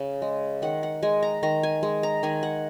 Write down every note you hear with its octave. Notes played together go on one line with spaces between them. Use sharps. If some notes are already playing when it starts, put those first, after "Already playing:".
Already playing: C#3
G#3
D#3 F#5
F#5
G#3 G#5
A#5
D#3 A#5
G#5
G#3
A#5
D#3 G#5
F#5